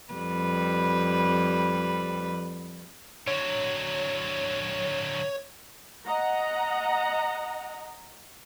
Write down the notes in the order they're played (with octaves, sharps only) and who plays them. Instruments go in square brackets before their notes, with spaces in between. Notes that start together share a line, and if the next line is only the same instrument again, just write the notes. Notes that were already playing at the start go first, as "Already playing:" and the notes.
[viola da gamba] F2 G3 B4
[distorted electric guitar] D3 F#3 [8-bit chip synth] C#5
[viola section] D#5 F#5 A#5